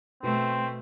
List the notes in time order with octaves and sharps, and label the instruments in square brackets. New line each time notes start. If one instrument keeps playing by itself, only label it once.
[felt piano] B2 [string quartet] A3 [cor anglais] C4